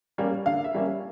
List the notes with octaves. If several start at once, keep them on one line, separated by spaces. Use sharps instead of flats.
G3 A#3 C#4
D3 F5
E5
G3 A#3 C#4